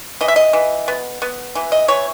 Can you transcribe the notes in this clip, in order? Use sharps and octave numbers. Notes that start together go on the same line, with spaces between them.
E3 D#5
E5
D#5
E3
B3
B3
E3
D#5
E3 C#5